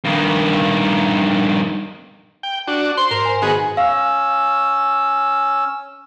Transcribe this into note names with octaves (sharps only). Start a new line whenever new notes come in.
G2 D#3
G5
D4 F#4
C5 C6
G#2 A#4
G#5
D#3 B3 F#4 G#4
C#4 F5 E6